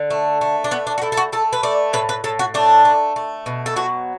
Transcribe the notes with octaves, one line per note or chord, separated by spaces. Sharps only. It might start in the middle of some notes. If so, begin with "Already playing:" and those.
Already playing: D3
A3
A3
D4
A3 B3
D4
F#4
A3 E4
A4
F#4
A3 A4
B4
A3 D5
A2 B4
B4
A2 A4
F#4
A3 D4
A3
A3
B2
A4
F#3 F#4